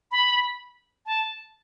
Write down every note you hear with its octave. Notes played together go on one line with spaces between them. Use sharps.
B5
A5